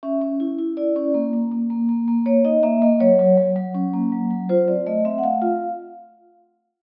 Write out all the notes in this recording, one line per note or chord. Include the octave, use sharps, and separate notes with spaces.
C#4 E5
C#4
E4
E4
E4 D5
C#4
A#3
A#3
A#3
A#3
A#3
A#3
A#3 C#5
D#4 D#5
A#3 E5
A#3 D#5
F#3 C#5
F#3
F#3
F#3
C#4
A#3
F#3
F#3
F4 C5
C4 D5
A3 D#5
C4 E5
F#5
A3 F5
F4